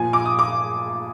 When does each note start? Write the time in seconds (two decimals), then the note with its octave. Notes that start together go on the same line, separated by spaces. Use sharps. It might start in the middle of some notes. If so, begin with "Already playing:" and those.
Already playing: A#2 F3 G#5
0.13 D6
0.25 D#6
0.39 D6